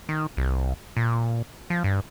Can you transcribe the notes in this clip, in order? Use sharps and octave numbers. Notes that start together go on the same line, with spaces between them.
D#3
C2
A#2
F3
G2